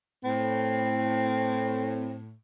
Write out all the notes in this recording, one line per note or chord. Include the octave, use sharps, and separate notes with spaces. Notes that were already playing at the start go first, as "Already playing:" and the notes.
A2 C4